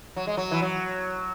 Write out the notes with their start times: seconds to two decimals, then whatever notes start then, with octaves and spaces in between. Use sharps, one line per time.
0.16 F#3
0.27 G#3
0.37 F#3
0.51 E3
0.62 F#3